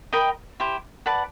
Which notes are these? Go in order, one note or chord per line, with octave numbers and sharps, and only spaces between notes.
A#4 D#5 G5 B5
E4 G4 C5
B4 D5 F#5 A5